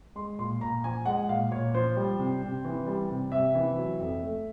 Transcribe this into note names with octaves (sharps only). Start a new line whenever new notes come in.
G#3 C6
A#2 C6
A#2 A#5
F3 G#5
G#3 F#5
A#2 F5
A#2 C#5
F3 C5
G3
C3
C3
E3
G3
C3
C3 E5
E3
F#3
F2
A3